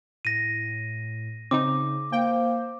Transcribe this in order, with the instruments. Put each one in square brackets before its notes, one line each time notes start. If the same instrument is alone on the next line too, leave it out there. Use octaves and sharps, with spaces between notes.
[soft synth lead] A2 [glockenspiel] A#6 D#7
[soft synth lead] C#3 [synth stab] C4 D#4 [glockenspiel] D6
[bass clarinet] A#3 [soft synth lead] C5 [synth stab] G5